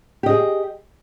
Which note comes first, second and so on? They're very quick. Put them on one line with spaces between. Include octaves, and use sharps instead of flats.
G4 D#5 G#4